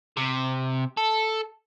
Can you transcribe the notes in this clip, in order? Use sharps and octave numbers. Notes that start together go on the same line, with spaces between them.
C3
A4